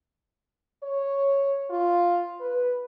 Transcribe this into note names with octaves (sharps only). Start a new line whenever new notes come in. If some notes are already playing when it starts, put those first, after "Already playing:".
C#5
F4
B4